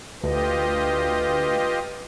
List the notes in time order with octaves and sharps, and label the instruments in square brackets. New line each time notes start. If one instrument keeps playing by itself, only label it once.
[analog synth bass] D2 [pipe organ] F4 G4 D#5 [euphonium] B4